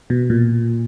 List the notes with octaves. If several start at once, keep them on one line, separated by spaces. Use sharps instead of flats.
B2
A#2